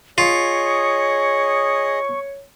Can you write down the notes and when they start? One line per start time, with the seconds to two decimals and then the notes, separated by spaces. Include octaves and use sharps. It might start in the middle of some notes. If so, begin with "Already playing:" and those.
0.18 F4 G#4 C#5 D#5 C#6